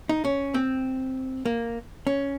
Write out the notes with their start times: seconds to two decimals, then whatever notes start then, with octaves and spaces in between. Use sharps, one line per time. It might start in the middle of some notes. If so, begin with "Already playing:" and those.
0.09 D#4
0.25 C#4
0.54 C4
1.46 A#3
2.07 C#4